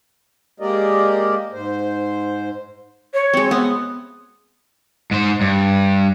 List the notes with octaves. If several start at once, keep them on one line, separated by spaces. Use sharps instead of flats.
G#3 A#3 G4 A#4 D5 D#5
G#2 C5
C#5
G#3 C4
B3 D#6
G#2 C5
G2